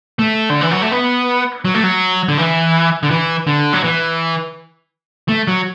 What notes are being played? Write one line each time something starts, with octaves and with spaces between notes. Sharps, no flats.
A3
D3
E3
F#3
A3
B3
F#3
A3
F#3
D3
E3
D3
E3
D3
F#3
E3
A3
F#3